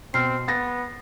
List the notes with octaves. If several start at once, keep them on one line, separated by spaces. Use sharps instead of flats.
B2 C4 F6 C7
B3 A6 A#6